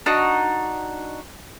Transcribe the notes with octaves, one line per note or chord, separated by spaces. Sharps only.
D4 D#4 F#4